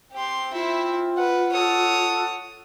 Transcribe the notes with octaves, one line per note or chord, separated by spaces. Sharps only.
C4 G4 C6
E4 F4 E5
B4 F#5
A4 C#5 D#6